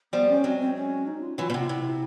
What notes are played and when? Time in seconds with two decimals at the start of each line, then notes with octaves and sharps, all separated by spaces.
0.13 F3 G3 B3
0.29 C#4
0.44 F#3 G#3 C4
0.60 C4
0.76 C#4
1.07 D#4
1.23 F4
1.38 E3 F#3 F4
1.50 B2
1.54 C3 F4
1.69 C3 E4